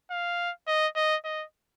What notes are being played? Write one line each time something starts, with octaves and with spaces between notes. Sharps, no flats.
F5
D#5
D#5
D#5